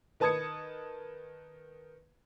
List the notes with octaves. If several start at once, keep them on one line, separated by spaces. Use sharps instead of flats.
D#3 B4 A5 D#6 G#6 C#7